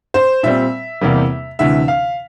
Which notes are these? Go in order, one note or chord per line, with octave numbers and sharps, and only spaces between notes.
C5
A#2 G3 C4 E5
E2 C3 G3 A#3
D2 C3 E3 E5
F5